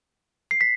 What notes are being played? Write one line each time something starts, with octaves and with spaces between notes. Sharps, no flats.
C7
B6